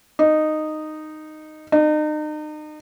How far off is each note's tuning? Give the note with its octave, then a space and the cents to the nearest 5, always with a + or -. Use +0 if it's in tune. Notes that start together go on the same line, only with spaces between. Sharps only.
D#4 -10
D#4 -35